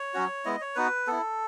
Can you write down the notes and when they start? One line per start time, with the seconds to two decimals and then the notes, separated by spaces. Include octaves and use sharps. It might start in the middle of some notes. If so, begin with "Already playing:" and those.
Already playing: C#5
0.14 F#3 C#4 F#4
0.45 G#3 B3 E4 D#5
0.61 C#5
0.76 B3 D#4 F#4 B4
1.07 B3 E4 A4